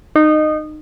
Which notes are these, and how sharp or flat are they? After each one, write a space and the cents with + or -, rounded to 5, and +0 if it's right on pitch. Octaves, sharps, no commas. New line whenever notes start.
D#4 -20